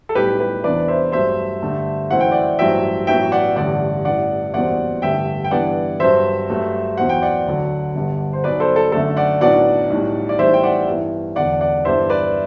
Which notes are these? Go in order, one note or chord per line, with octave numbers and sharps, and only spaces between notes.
A4
B1 A2 G3 G4 B4
G4 B4
E2 C3 E3 B3 D4 B4 D5
C5 E5
G2 F#3 A3 C5 E5
G2 D3 A3 D4
F#2 E3 A3 C4 E4 F#5
G5
D5 F#5
A1 G2 F#3 C4 E4 E5 G5
A1 A2 F#3 B3 E5 G5
D5 F#5
A1 G2 D3 D5 F#5
A1 G2 E3 D5 F#5
F#1 E2 B2 G3 C4 D5 F#5
A1 G2 D3 E5 G5
G5
G2 E3 B3 D4 D5 F#5
G2 F#3 C4 C5 E5
G2 F#3 A3
E2 B2 F#3 C4 F#5
G5
D5 F#5
D2 D3 F#3
G1 G2 D3
C5
B1 B2 F#3 B3 B4 D5
A4 C5
A4
F#2 D3 A3 D4 A4
D5 F#5
B1 A2 F#3 B3 D4 D5 F#5
B1 A2 G3
D5
B1 A2 E3 G3 C4 C5 E5
G5
D5 F#5
G2 E3 B3 E4
E1 E2 D3 D5 F#5
D5 F#5
G2 E3 G3 B3 D4 C5 E5
B4 D5